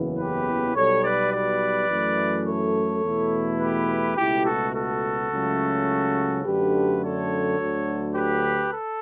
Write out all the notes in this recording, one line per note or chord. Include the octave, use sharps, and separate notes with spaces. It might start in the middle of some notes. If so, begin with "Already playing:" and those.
Already playing: F#1 E2 C#3 E3 B3
G4 B4
B1 B2 G3 A4 C#5
B4 D5
B4 D5
F#2 E3 A3
A4 C#5
E2 B2 A3 E4
G4 B4
C#2 B2 A3 E4 G4
F#4 A4
F#4 A4
C#2 C#3 F#3 A3 C#4
F#2 D3 A3 D4 G4 B4
A4 C#5
D2 D3 F#3
G4 B4
A4